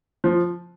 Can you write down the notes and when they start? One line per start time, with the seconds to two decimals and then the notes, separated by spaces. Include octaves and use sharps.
0.24 F3